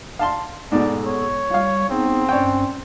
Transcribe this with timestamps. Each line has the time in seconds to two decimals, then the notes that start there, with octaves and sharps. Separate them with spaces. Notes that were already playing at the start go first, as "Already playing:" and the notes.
0.19 F5 A5 C6
0.72 G#2 B2 B3 G#4 A4 D5
1.06 C#5
1.50 G3 F4 F5
1.90 B3 C4 D#4 G#4
2.29 G2 C#4 D4 C#5 G5